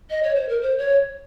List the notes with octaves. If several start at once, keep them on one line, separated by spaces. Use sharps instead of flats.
D#5
C#5
C5
A#4
C5
C#5